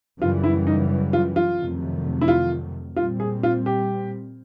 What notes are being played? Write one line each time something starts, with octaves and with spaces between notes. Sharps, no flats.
F#2 C#3 E3 G3 F4
E4
D#4
F4
F4
F2 C3 D#3 F#3 A3
E4
F4
A#2 G3 C4 F4
G#4
F4
G4